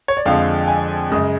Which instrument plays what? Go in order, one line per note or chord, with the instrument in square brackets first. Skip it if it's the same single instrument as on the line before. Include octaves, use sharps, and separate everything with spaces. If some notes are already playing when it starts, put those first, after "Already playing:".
[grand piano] C#5
D5
F2 D3 F3 G#3 F5
G#5
F#2 C#3 G#3